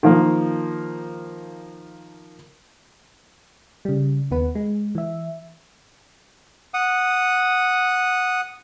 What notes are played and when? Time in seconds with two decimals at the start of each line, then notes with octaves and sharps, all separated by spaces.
0.03 D#3 F3 A#3
3.85 C#3 G3
4.31 D#2 B3 B4
4.55 G#3
4.95 E3 E5
6.74 F#5 D#6